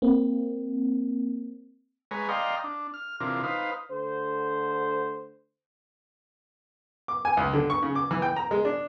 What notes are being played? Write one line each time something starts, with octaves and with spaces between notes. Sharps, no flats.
A#3 C4
G#3 B4 C#5 G#5 A#5
D5 D#5 F5 G5 A#5 C6
D4
F6
C3 E3 D4 F4 A#4
D#4 B4 C5 F5
D3 A3 C5
D6
G#5
C#2
D3
C#6
C#3
D6
E3
G5
A#5
G#3
D4